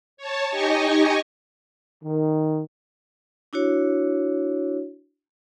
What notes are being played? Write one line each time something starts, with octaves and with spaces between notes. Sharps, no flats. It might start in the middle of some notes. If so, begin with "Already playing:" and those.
C#5 A5
D#4 G4 D#5 G#5 C#6
D#3
D4 E4 F#4 C#5